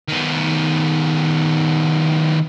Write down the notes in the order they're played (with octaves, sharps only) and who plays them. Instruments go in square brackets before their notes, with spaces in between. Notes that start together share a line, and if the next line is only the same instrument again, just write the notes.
[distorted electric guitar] D#3 B3